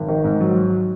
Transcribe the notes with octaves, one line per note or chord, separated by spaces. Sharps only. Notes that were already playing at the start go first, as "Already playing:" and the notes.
Already playing: G#1
D#3
G#2
F#3